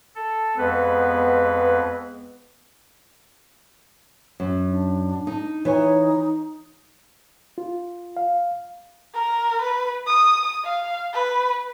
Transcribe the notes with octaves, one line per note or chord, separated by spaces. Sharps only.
A4
F2 G#3 B3 B4
F#2
D4
D#4
E3 D#4 C#5 G#5
F4
F5
A#4
B4
D#6
F5
B4